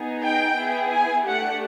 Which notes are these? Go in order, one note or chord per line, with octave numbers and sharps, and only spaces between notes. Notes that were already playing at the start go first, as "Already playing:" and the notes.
Already playing: B3 D#4 G#4
G5
B3 E4 G#4
G#5
A3 D4 G4 F#5